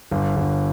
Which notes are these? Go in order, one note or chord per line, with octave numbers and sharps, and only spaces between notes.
G1
G1